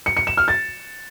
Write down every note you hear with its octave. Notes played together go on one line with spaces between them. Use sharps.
C#7
C#7
E7
F6
A6